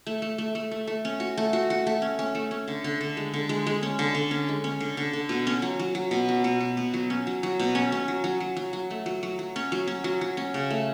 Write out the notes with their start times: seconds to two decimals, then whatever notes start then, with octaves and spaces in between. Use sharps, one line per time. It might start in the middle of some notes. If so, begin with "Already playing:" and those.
0.07 A3
0.22 A3
0.38 A3
0.55 A3
0.71 A3
0.87 A3
1.05 C#4
1.20 F#4
1.37 A3
1.53 F#4
1.70 F#4
1.87 A3
2.02 C#4
2.19 C#4
2.35 A3
2.51 C#4
2.68 D3
2.84 D3
3.01 D3
3.17 G#3
3.34 D3
3.49 G#3
3.67 G#3
3.83 C#4
3.99 D3
4.15 D3
4.31 C#4
4.49 G#3
4.64 C#4
4.80 D3
4.97 D3
5.13 D3
5.29 B2
5.47 C#4
5.62 F#3
5.79 F#3
5.95 F#3
6.11 B2
6.29 F#3
6.44 B2
6.60 B2
6.77 B2
6.94 F#3
7.10 C#4
7.27 F#3
7.43 F#3
7.59 B2
7.75 C#4
7.92 C#4
8.08 F#3
8.24 F#3
8.40 F#3
8.57 F#3
8.73 F#3
8.91 A3
9.06 F#3
9.23 F#3
9.39 F#3
9.56 C#4
9.72 F#3
9.88 C#4
10.04 F#3
10.21 F#3
10.37 C#4
10.54 C#3
10.70 A3